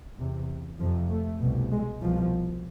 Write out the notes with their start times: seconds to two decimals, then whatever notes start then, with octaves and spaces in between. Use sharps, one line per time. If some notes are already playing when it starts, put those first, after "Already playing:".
0.18 E2 C3
0.79 F2 C3 F3
1.09 A3
1.40 C2 B2
1.71 G#3
2.01 C2 B2 F3